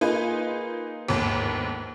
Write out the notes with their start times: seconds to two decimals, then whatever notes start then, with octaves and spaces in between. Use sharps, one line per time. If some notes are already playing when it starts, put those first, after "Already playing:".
0.01 A#3 D#4 F4 G#4 B4
1.09 G1 D#2 G#2